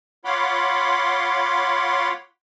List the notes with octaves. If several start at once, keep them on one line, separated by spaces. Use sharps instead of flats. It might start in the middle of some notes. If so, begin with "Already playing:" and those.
F4 C#5 F#5 B5 C6 D6